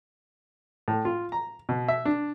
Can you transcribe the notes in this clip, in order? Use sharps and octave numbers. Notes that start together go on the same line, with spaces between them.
A2
F4
A#5
B2
E5
D4